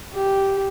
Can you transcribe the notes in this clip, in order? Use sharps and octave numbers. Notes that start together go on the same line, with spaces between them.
G4